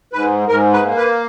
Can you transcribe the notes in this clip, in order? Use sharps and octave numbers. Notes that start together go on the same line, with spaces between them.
G#2 B4
G#2 A#4
B4
A#3
B4